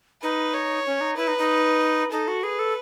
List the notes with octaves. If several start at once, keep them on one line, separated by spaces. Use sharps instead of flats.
D#4 B4
C#5
C#4
D#4
E4 B4
D#4
D#4
D#4 A4
F#4
G#4 B4
A4